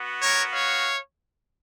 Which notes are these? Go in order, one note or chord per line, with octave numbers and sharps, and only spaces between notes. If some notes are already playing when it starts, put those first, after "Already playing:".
Already playing: B3 F#4
A#4 C#5
C#5 F5